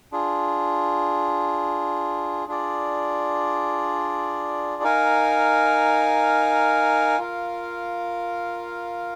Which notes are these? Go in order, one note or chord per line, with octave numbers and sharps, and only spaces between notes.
D4 F4 G#4
D4 F4 G#4 D5
D#4 A#4 F5 G#5
F4 A#4 F5